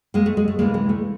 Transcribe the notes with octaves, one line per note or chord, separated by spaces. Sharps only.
G#3 A#3
A3
G#3
A3
D2 C3 E3 G#3 A#3
G#3
A3